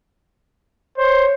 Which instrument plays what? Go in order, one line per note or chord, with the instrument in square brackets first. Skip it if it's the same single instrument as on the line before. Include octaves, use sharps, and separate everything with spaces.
[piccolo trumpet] C5 [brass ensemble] C#5